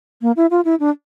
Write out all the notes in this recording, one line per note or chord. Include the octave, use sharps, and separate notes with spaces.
A#3
E4
F4
E4
D4